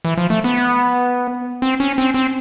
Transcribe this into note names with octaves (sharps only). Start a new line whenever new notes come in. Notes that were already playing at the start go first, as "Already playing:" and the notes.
E3
F3
A3
B3
C4
C#4
C4
C4